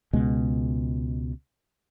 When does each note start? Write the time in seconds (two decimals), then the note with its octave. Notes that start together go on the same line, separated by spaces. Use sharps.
0.13 C#2 B2 G#3